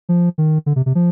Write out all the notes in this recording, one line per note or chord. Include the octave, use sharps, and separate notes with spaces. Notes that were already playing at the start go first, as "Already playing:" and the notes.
F3
D#3
D3
C3
C3
F3